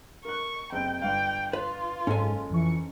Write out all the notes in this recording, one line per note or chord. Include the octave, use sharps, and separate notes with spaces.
A#4 C#6 F#6
F#1 C3 G5
G1 F5 G5
F4 B4
F#1 G#2 C#4 A4 G#5
F2 E3 C#6